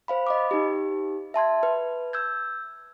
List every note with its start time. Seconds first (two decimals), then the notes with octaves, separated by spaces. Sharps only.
0.08 C5 F5 B5
0.27 D#5 B5 D6
0.51 D#4 G4
1.34 E5 A5 C6 G#6
1.63 B4
2.13 E6 G6 G#6